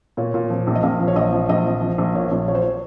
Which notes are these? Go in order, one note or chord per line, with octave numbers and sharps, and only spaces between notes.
A#2 C#5
A#2
F3
A#1
D#5
A#1 F5
F3
C#5
A#1 D#5
F3
A#1 D#5
F3
F3
A#1
A#2 C#5
A#1
F3 C#5
C5
C#5